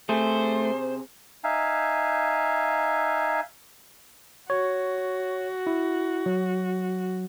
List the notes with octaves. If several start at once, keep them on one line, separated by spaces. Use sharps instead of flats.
C3 A3 G#4 C5
D#4 E5 F5 G#5
F#4 C#5
E4
F#3